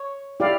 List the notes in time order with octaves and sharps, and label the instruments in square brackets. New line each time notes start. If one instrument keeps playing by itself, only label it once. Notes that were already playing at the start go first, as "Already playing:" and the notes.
Already playing: [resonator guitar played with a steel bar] C#5
[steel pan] E4 G4 D5 F5